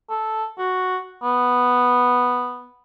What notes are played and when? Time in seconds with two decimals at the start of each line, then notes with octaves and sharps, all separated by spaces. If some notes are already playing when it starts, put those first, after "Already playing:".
0.10 A4
0.58 F#4
1.23 B3